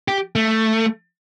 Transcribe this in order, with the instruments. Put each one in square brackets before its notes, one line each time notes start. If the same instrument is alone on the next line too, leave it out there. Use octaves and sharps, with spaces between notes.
[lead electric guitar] G4
A3